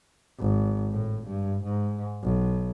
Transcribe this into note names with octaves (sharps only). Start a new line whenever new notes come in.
G#1
A2
G2
G#2
B1